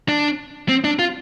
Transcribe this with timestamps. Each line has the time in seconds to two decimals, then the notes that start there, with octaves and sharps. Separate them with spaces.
0.09 D4
0.69 C4
0.84 D4
0.99 F4